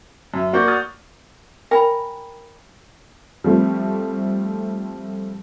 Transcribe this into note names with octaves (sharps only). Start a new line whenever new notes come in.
F#2 E5
A#3 F#4 D5 F#5 G6
D#6 F6 A6
A#4 G5 G#5 B5
F3 G3 A3 C4